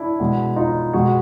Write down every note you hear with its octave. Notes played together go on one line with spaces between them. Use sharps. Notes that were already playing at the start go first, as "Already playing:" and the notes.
Already playing: D4 E4
B2 G#3
D#4 F4
B2 G#3 F#4 G#4